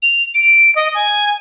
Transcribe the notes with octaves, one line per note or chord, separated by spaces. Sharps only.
F7
D7
D#5
G#5